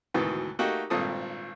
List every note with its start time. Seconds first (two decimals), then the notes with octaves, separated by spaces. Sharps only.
0.14 D2 G#2 B2 D#3 E3
0.59 A3 A#3 D#4 F#4 G4
0.90 G#1 G2 A#2 C4 A4 D#6